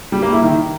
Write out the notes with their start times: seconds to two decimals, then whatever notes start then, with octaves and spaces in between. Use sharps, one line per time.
0.12 G3
0.22 A#3
0.32 E4
0.43 D#3